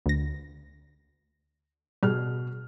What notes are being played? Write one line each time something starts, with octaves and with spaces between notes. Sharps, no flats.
D2 A#6
B2 G3 G#4 F6